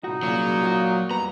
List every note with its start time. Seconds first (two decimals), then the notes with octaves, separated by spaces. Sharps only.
0.04 C2 A2 D#4 F#4
0.23 C2 A#2 C#3 F#3
0.63 F#4 C#5 F5
1.11 F2 G3 B3 A#5